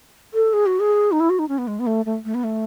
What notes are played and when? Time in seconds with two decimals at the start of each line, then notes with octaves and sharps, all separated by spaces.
0.34 A4
0.53 G#4
0.66 F#4
0.80 G#4
1.12 D#4
1.20 E4
1.30 F#4
1.39 D#4
1.48 C#4
1.58 B3
1.67 G#3
1.79 B3
1.87 A3
2.05 A3
2.25 A3
2.34 B3
2.44 A3